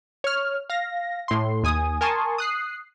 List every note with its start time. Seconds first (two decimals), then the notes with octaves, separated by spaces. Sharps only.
0.24 C#5 F6
0.70 F5 A#6
1.28 A2 C6
1.63 D#2 G#5 D#6
2.01 A#4 G#5 A5 C6 C#6 D#6
2.38 D#6 F#6 C7